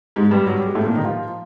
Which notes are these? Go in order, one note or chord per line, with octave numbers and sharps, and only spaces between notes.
G#2 G#3
G2 G3
F#3
G3
G#3
A2 A3
A#2 A#3
D#3 D#4
F3 F4